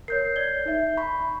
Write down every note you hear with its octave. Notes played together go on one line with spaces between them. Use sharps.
A#4 C#5 G6 C7
D5 G#6 G7
D#4 E5
B5 C#6